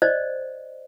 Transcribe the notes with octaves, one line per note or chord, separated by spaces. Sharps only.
C5 D5 D#5